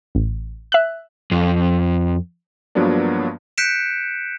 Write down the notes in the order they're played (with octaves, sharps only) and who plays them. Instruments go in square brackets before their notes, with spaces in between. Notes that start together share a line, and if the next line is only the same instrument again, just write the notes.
[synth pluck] A1
E5 F#6
[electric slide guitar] F2
[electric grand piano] G2 F3 F#3 A#3 B3 D4
[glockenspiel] F#6 G6 B6 C#7 D7 E7